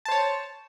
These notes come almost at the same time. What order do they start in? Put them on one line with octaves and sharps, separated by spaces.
A5 C5 C#5